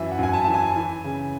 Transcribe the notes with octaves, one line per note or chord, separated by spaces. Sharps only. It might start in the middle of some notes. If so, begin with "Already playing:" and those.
Already playing: F#2 E3 E5
F#5
F#2 G#5
A5
E3 A5
G#5
E3
C#3